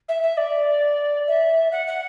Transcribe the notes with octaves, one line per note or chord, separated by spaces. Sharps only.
E5
E5
D5
E5
F#5
F#5